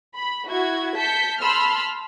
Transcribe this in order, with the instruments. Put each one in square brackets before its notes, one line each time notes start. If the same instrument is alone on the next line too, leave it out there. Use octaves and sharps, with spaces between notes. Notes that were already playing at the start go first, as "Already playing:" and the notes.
[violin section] B5
E4 F#4 G#6
A5 G6 B6 C#7
A5 B5 C6 E6 F6